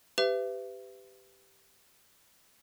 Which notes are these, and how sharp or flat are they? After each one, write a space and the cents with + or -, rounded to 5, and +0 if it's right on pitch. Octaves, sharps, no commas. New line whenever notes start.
G4 +0 B4 +30 E5 +25